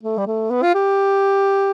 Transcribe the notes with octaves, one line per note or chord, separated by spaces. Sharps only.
A3
G3
A3
B3
F4
G4